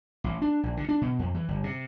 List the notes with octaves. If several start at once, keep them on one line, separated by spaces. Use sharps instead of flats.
A1
D4
A#1
D3
D4
B2
F2
E3
G1
C3